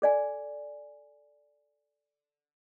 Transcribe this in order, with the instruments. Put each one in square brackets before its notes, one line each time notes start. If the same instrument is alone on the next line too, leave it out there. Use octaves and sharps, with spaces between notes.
[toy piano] A4 D5 G#5